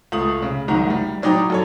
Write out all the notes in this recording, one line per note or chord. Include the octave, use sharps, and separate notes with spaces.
C#2 A3 D#6 F#7
C#3
F#1 C2 D#3 F#5 A#5
G3
A2 F#3 D#4 D5 G5 A#5
F#2 A4 C#5